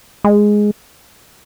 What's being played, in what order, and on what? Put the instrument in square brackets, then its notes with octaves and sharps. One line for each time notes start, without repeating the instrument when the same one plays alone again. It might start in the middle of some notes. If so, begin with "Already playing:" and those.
[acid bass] G#3